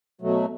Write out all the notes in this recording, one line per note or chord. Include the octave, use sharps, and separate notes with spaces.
B2 F#3 A3